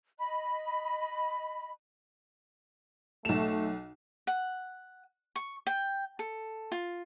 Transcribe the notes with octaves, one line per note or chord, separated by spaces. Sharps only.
D#5 B5
B1 A3 E7
F#5
C#6
G5
A4
F4